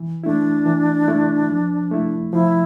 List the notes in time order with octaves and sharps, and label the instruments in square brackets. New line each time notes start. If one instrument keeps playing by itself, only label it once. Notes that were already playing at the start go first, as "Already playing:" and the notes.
Already playing: [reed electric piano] E3
[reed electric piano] A3 E4 [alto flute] D4
[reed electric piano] E3
A3 E4
F3
A3 E4
[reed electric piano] F3 [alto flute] E4